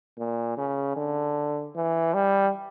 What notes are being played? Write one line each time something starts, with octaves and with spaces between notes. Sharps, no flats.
A#2
C#3
D3
E3
G3